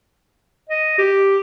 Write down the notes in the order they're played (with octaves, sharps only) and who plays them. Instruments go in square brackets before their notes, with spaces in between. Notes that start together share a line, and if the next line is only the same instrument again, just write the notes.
[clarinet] D#5
G4